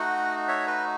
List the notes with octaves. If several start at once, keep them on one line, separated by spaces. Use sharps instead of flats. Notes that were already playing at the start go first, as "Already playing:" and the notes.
Already playing: A3 D#4 F#4 D#5 F#5
C#5 E5
B4 D#5